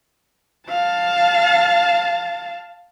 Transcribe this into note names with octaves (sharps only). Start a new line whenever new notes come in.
F5 A5